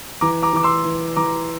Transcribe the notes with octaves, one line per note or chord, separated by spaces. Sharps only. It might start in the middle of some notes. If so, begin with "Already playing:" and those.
E3 A#5 D6
A#5 D6
E3 D6
C6 E6
E3
E3 A#5 D6